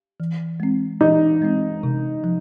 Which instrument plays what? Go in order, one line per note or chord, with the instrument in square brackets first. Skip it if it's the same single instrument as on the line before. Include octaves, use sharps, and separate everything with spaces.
[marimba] E3
G#3 C4
[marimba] E3 [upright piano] D#4
[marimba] G#3 C4
C3
F3